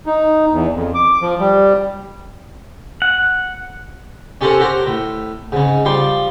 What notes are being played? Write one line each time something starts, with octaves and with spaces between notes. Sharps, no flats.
D#4
E2
F2
D6
F3
G3
F#5
C#4 G4 A4 A#4 C5 F#5
F#4 G4 A#4 C5
A2
G#2 C#3
F3 G3 C6 D6